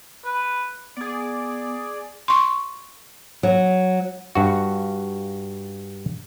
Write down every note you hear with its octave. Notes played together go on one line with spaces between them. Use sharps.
B4
B3 G#4 D5
C6 C#6
F#3
G2 F#4